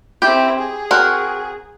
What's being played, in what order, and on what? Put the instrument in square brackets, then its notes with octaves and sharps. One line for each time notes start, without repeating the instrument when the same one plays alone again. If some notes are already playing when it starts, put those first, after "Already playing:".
[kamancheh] C4 E4 [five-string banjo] G4
[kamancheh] G#4
[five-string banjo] C4 F#4 A#4